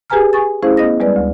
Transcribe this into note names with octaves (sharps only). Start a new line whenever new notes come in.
G4 G#4 B4 G#5 A#5 F6
G#5 C#6 D#6 A6
A3 C#4 E4 G#4 C5 F5
B3 D#5 D#6 A#6
G3 G#3 B4 D5
D2